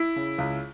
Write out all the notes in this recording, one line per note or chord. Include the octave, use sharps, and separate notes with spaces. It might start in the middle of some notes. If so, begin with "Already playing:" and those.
Already playing: E4
C#3
C#2